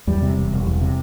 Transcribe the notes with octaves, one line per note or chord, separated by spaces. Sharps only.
E2 G3
C3
E1
E1
E2
C3